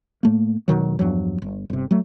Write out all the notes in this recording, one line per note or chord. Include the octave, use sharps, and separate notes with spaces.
A2 A3 A#3
E1 B2 D#3 F#3
E2 G2 F3 F#3
G1
G1 C3
F#3 A3